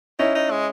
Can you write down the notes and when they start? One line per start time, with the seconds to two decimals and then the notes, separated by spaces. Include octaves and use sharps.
0.19 C#4 D#4 E4
0.35 D#4
0.51 G#3